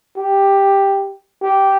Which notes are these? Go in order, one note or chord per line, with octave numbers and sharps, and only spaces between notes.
G4
G4